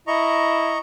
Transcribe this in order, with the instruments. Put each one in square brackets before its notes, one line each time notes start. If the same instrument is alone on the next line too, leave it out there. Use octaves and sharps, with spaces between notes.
[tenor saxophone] E4 [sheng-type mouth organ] D#5 A#5 C#6